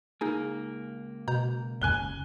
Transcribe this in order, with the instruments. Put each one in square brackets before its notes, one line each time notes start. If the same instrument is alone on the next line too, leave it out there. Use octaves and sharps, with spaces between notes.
[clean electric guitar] C#2 A#3 [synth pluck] D#4 G#4 G#5
[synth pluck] B2 A#5 G6
[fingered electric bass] F#1 D#2 C#3 [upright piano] G#5 F#6 G7